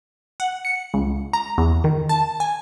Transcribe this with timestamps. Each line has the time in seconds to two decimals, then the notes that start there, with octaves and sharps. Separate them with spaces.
0.40 F#5
0.65 C#7
0.94 C#2
1.33 A#5
1.58 E2
1.84 D#3
2.09 A5
2.40 G#5